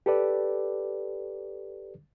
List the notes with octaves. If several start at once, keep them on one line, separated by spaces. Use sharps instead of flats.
G4 A4 B4 D5